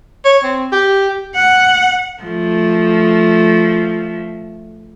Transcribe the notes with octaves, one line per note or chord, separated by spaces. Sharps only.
C#5
C4
G4
F#5
F3 A3